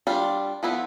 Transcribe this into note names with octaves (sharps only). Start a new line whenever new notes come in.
G3 D4 F4
F3 B3 E4 A4